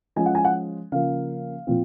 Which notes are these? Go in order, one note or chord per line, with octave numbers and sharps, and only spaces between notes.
F3 G#3 C#4 G#5
F#5
G#5
F#5
C#3 F3 A#3 F5
A#2 F3 C4